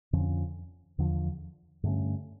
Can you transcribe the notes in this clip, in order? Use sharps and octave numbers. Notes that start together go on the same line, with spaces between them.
F2 D3 F3 C#4
E2 D3 F3
G2 D3 A3 C#4